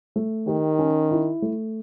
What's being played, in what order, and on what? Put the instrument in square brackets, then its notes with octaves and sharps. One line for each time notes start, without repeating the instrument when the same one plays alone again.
[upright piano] A3
[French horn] D#3 [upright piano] G4
[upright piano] C#4
E4
A3